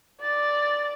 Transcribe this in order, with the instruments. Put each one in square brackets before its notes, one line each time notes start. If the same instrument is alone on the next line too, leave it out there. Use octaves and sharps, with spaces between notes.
[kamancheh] D5 [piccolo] A6